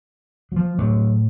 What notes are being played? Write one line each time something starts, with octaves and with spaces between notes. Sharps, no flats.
F#3
F3
A2 F#3